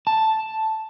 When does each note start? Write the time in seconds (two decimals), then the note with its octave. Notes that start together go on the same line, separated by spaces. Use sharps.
0.07 A5